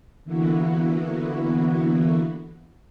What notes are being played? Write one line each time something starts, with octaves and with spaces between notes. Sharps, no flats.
D3 E3 A#3 B3 E4 F#4